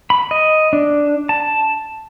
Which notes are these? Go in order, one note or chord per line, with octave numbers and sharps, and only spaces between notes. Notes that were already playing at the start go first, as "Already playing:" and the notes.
B5
D#5
D4
A5